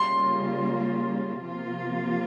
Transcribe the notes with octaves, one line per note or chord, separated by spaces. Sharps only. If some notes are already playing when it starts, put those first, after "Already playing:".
Already playing: C#3 G3 A#3 F4 C6
C3 F3 A#3 F4